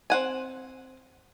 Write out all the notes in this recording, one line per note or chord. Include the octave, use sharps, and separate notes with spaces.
C4 F#5 G#5